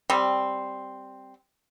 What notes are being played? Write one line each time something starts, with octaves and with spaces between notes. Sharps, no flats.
G3 C4